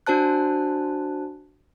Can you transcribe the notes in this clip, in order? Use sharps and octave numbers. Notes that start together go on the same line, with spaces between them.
D4 F#4 C5 A5 F#6